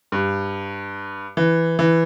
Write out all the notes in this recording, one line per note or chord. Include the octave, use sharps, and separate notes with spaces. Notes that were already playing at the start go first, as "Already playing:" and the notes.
G2
E3
E3